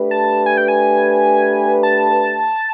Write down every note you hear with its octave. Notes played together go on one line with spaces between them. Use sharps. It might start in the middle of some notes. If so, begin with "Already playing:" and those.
Already playing: A3 D4 G4 B4
A5
G#5
G5
G#5
A5